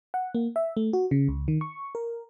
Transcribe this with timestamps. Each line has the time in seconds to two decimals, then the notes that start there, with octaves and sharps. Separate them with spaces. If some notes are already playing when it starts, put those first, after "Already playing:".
0.14 F#5
0.35 A#3
0.56 E5
0.77 A3
0.93 F#4
1.11 C#3
1.28 C#2
1.48 D#3
1.61 C#6
1.95 A#4